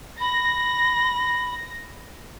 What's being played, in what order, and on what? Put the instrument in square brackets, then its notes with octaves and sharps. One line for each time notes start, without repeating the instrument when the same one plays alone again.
[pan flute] B5 [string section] A#6